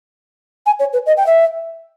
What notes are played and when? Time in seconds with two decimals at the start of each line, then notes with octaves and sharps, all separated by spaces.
0.66 G#5
0.79 C#5
0.93 B4
1.06 D#5
1.17 G5
1.26 E5